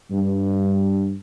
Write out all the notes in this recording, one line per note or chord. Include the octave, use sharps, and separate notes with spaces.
G2